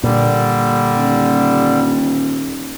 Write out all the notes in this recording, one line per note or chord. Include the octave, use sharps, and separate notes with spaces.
A#2 D3 G3
D#1